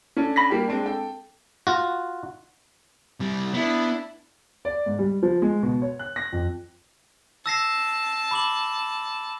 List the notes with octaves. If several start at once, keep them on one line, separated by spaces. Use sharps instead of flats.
C#4 D4 A4
B5 A#6 B6
G3 A#3 G4
G#3 C4 D4
A4 G5
F4 F#4
C3 G3
B3 D4 E4
D5
G#2
G3
F3
G#3
B2
C#5
F#6
A#6
F2
A5 E6 A#6 C7
B5 D6 F#7